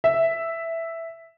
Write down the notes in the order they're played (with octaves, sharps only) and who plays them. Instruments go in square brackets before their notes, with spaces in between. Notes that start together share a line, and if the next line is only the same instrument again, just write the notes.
[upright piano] E5